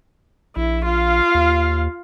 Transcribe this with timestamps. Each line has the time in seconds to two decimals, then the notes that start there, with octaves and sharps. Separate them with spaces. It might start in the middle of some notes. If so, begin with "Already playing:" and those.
0.56 A#1 E4
0.85 F4 F5
1.34 D#2